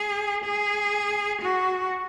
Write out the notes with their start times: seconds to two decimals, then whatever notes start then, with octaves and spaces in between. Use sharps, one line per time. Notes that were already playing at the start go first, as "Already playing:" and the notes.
Already playing: G#4
0.44 G#4
1.42 F#4